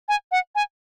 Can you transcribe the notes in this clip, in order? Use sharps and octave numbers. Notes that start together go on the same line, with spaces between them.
G#5
F#5
G#5